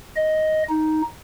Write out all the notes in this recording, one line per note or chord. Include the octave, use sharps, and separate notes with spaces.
D#5
D#4